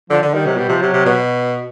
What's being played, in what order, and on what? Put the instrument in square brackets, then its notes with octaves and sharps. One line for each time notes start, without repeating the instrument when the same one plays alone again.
[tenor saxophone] D3 [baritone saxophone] F3
[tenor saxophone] D3
[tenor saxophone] D#3 [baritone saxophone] G3
[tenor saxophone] C3 [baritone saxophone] F#3
[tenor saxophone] B2 [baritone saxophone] G3
[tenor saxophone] C3 [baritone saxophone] F3
[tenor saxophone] C3 [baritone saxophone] F#3
[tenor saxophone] C3
B2